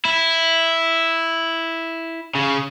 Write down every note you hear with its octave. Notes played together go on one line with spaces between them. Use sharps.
E4
C#3